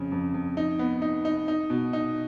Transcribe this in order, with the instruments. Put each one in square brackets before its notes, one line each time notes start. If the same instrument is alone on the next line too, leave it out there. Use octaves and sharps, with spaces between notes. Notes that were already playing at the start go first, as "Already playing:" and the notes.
Already playing: [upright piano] F2 C#3
F2
F2
D#4
B3
D#4
D#4
D#4
B2
D#4